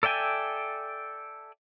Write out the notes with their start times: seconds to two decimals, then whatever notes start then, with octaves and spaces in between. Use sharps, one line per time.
0.03 A4 D5 E5 G5 G#5